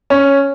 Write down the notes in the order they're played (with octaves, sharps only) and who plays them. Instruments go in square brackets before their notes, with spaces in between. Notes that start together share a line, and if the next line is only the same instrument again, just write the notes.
[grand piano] C#4